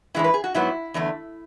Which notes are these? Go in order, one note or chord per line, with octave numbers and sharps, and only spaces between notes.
A2 E3 G#3 D4 E4
B4
G#4
F#4
G#2 F#3 B3 E4
E2 D3 A3 D4